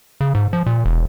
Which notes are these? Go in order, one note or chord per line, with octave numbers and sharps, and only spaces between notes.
C#3
G#2
F3
A#2
E1